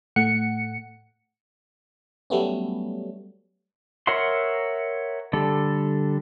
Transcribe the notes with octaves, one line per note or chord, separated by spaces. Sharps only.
A2 A3 F#5 C#7
F#3 G3 A3 B3 C#4
A#4 C#5 E5 F#5 C6
D3 G3 A4